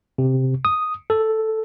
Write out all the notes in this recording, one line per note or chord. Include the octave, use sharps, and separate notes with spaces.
C3
D#6
A4